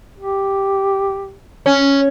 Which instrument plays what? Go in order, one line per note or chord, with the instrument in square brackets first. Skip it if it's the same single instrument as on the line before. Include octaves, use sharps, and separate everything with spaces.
[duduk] G4
[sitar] C#4